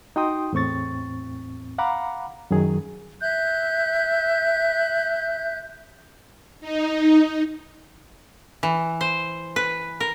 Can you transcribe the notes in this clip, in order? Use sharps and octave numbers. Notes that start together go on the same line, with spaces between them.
D#4 F#4 G5 C6 D#6
E2 A2 C4 C#6 A6
F5 F#5 A#5 B5 D6
F#2 D#3 F#3 G#4
E5 F#6 G6
D#4
E3
C5
B4
A#4